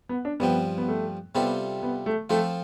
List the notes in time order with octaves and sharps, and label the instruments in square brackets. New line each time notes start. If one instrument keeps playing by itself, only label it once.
[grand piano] B3
D4
[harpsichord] G2 F3 C4 [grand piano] B3
[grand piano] B3
A3
[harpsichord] C3 G3 C4 F4 A4 [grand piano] B3
[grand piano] B3
A3
[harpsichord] F3 C4 F4 A4 [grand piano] A3